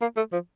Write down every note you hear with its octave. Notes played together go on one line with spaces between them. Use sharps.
A#3
A3
F3